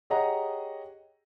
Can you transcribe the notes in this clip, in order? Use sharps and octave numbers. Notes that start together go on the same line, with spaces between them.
G4 G#4 C#5 D#5 F#5 A#5